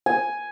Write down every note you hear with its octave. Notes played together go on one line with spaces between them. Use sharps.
G#5